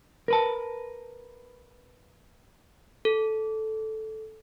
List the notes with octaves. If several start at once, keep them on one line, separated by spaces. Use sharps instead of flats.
A#4 B4 A5
A4